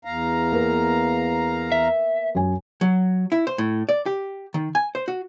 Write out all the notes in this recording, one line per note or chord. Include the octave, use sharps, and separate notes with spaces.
E2 F5 A#5
A#3 B3 B4
E5
F#2 G#5
F#3
E4
C5
A2
D5
G4
D#3
G#5
C5
F#4